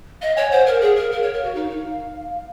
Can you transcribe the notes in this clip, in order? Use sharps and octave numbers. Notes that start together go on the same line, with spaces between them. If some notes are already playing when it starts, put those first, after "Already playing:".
D#5 F5
C#5 G#5
C5 F#5
A#4 F5
G#4
A#4
A#4
C#5
A#4
F#4
D#4 F5
D#4